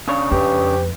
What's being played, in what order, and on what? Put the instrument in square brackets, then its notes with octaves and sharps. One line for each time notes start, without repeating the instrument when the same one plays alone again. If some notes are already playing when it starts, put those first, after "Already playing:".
[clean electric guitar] C#3 D4 C#5
[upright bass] F2 [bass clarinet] G4 [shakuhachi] B4